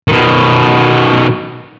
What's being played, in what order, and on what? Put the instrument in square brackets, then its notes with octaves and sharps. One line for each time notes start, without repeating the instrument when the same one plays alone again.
[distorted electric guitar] B2 D#3